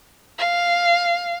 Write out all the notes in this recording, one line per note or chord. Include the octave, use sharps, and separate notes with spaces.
F5